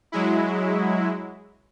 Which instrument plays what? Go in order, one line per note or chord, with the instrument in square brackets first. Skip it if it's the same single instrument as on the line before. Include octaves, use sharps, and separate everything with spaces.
[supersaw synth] F#3 G#3 E4